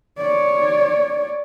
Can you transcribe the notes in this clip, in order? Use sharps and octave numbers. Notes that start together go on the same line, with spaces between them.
C#5 D5